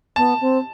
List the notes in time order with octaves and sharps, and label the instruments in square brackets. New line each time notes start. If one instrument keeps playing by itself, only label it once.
[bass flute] B3 [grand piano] A5
[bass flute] C4